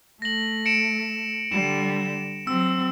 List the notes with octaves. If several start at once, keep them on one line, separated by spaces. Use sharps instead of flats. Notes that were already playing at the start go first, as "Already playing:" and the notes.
A3 A#6 F#7
C#7 D7 E7
D3 G3 E7
F#3 C4 E6